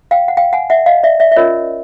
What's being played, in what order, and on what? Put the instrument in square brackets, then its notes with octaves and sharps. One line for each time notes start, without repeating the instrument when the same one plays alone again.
[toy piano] F5 G5
F#5
F5 G5
F#5 G#5
E5 F#5
D#5 F5
D5 E5
D5 E5
E5
C#4 F4 A#4 C#5 D#5